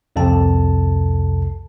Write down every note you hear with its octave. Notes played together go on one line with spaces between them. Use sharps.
C2 F2 C3 A4 A5